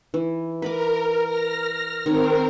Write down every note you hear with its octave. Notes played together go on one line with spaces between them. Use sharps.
E3
A#4 B4 B5 D6
F6 A#6
D#3 C4 A#4 C#5